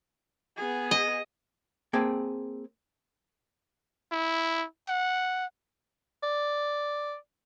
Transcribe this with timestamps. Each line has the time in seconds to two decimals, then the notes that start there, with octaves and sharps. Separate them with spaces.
0.57 B3 G#4
0.91 D#5
1.93 A#3 C4 G#4 G5 A5
4.12 E4
4.89 F#5
6.23 D5